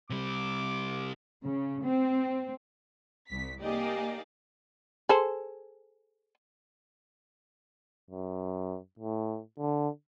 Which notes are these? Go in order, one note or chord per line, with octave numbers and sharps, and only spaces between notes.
C3 G3 D6
C#3
C4
C2 B6
A#3 D#4 G4 G#4 D5 D#5
G#4 A4 C5
F#2
A2
D3